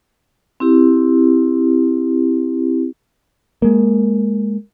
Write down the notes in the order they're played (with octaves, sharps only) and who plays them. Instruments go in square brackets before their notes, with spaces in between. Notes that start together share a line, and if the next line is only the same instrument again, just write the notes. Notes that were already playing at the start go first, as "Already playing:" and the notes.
[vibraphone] C4 E4 G4
[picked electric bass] G#3 A#3